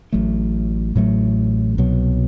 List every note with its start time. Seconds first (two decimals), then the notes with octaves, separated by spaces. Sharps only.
0.12 A1 A2 F#3 A3
0.95 A1 A2 F#3 A3
1.78 C2 B2 F#3